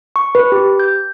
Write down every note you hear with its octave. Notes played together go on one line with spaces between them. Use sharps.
C#6
B4
G4
G6